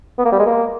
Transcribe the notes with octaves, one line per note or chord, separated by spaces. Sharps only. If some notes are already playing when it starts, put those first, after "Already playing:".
B3
A#3
G3
G#3
A#3